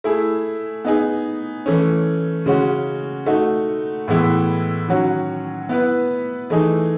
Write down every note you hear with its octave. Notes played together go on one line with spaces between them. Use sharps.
A3 E4 G#4
B3 D#4 G#4
E3 A3 C#4
C#3 G#3 C#4 F#4
A3 D#4 F#4
A2 E3 G#3 B3 E4
D#3 F#3 C#4 F#4
B3 E4 B4
E3 A3 D#4 G#4